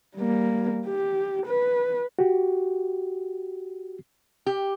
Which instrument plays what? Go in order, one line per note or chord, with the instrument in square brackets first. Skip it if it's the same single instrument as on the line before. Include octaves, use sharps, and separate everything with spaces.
[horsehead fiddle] G3 A#3
G4
B4
[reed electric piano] F#4 G4
[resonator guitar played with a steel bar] G4